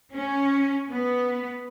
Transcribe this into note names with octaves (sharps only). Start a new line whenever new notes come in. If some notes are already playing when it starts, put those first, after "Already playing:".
C#4
B3